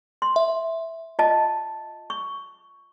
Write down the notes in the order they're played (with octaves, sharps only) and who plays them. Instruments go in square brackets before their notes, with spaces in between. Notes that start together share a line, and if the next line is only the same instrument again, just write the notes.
[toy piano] C6
[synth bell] E5
[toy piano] F4 D#5 A5
C#6